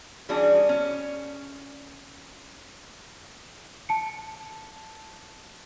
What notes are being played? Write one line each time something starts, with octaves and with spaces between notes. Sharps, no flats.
E3 G3 C#4 D4 F#4 G#4
C#4
A5 C#7